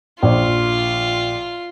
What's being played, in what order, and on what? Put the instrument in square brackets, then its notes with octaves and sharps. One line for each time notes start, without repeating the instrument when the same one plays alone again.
[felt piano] A#1 [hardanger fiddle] F4